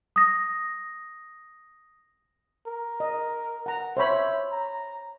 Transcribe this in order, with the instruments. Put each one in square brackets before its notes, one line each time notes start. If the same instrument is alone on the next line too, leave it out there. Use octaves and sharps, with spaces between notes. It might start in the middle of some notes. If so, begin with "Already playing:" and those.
[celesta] D#6 A#6
[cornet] A#4
[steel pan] D#5
F#5 A#5
[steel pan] C5 C#5 B5 [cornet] E5
[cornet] A#5